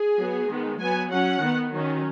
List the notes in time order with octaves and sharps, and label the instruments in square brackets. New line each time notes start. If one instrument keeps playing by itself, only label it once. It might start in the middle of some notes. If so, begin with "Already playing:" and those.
Already playing: [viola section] G#4
F#3 B3
D#3 G#3 B3
F#3 B3 G#5
F#3 C#4 F#5
D#3 B3
D#3 F#3 C#4